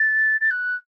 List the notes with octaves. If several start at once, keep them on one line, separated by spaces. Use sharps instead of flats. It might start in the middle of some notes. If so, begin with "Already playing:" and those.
Already playing: A6
A6
F#6